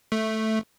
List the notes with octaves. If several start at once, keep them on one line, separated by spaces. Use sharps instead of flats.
A3